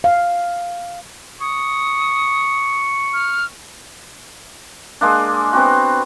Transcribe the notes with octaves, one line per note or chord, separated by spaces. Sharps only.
F5
C#6 D#6
F6
G#3 A#3 D4
B3 C4 F#4